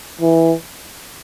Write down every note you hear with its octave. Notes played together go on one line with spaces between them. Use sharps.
E3